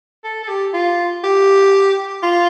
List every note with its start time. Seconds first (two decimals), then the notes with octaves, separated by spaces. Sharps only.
0.24 A4
0.43 A4
0.48 G4
0.74 F4
1.24 G4
2.23 F4